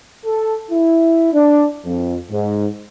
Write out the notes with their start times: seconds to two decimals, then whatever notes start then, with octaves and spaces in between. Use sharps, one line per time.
0.25 A4
0.69 E4
1.33 D4
1.85 F2
2.30 G#2